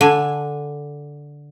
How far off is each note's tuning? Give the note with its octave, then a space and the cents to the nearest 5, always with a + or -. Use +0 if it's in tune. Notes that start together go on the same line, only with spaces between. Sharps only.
D3 -5 G#5 -10